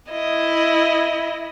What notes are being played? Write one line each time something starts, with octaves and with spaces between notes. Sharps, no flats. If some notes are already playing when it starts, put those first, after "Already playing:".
E4 D#5